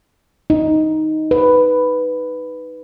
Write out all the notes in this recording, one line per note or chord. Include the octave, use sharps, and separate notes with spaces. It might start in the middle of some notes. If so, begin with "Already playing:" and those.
D#4
B4